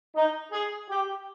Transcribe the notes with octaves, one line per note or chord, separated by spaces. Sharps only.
D#4
G#4
G4